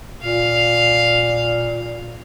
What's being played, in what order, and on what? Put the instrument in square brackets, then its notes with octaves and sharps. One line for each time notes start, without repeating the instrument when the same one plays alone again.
[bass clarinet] A#2 [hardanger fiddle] F5